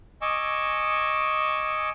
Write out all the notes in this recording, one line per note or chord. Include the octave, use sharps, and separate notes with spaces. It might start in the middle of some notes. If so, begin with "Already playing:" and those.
D#5 G#5 C#6 D6 E6